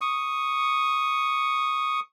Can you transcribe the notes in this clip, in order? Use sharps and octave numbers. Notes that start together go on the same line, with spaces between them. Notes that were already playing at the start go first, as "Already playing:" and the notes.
C#6 D#6